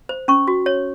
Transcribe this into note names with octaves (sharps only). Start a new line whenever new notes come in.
C5
C#4 C#6
F#4
C#5